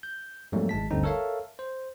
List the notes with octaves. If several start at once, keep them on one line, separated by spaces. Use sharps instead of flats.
G6
F2 G#2 F#3 G3 A3 A#3
G#1 G#3 A5 B6
G1 D2 D3 G3 C4 D#4
A4 A#4 C#5 E5 F5
C5